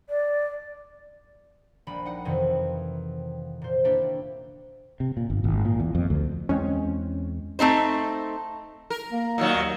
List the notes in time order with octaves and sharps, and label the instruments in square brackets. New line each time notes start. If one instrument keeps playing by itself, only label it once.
[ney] D5
[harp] A#1 G3 B5
D#4 F#5
F2 C3 D#3 E3
A#2 C5
A3 A#3 D4 E4 G4
[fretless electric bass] C3
A#2
G1
G#1
A#2
E2
F2
D2
[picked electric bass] E2 G#3 C4 [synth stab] C#4
[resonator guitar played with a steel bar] A3 C4 D#4 C5
[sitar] A#4
[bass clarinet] A#3
[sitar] A#2 D#3 F#3
[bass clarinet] D#2